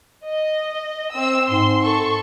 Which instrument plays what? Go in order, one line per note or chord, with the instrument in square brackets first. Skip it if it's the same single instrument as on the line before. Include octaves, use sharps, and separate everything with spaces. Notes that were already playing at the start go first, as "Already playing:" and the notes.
[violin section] D#5
C4 E6
[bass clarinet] G#2 [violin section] C6
[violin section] A4 C#6